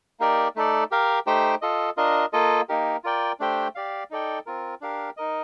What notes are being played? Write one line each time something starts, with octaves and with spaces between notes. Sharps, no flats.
A#3 D#4 G4 A#4 D5
A3 D#4 A4 D5
G4 A#4 F5
A3 D#4 G4 C5 G5
F4 A4 D#5
D4 F4 A#4 D#5
A#3 F4 A4 D#5
A#3 D#4 G4 A#4
F4 A#4 D5 G5
A3 D4 G4 C5 G5
G4 D5 F5
D#4 A4 D5 G5
C4 F4 A#4
D4 G4 A#4 F5
D#4 A#4 D#5